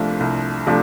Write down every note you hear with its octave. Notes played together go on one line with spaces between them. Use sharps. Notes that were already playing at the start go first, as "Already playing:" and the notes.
Already playing: C2 C3 F3 A3 D4
C2
C3 F3 A3 D4